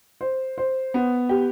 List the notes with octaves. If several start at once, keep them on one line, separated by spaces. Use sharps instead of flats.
C5
C5
B3
G4